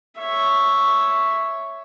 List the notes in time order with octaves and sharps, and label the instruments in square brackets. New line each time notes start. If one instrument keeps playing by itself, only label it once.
[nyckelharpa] C#5 E5